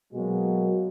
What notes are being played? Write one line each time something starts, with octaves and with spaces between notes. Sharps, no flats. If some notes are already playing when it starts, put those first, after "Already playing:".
B2 F#3 G#3 A#3 F#4